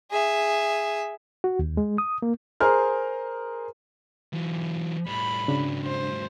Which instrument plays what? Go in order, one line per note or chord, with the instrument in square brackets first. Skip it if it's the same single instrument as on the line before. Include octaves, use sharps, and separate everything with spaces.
[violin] G#4 E5
[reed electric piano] F#4
D#2
G#3
D#6
A#3
[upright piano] G#4 A#4 C5 F6
[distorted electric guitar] E3 F#3
[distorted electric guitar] A2 G3 [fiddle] B5
[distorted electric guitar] G#2 F#3 [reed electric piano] C#3 D4
[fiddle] C5